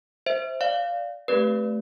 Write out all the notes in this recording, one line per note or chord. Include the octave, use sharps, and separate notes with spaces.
C5 E5
D5 F5
A3 C4 G4 B4 D5